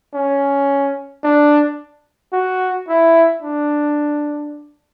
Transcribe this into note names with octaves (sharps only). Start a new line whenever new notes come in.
C#4
D4
F#4
E4
D4